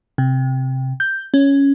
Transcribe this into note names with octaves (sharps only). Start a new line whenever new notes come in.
C3
G6
C#4